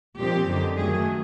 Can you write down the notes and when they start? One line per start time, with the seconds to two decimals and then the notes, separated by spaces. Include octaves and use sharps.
0.18 A#2 F3 G#3 C4 D#4 G4
0.47 F#2 D3 F#3
0.76 F#2 D#3 F#3 A3 G#4